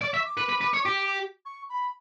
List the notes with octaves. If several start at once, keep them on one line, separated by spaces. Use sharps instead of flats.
D5 C#6
E5
D6
B4
B4
B4
C#5
G4
C#6
B5